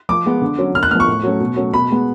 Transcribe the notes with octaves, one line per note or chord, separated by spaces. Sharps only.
F3 D6
G#3 B3
D3
F#3 C#4
D3 F6
F#6
F3 B3 C#6 F6
A2
F#3 A3 C#4
B2
F#3 A3 C#4
B2 B5
G#3 B3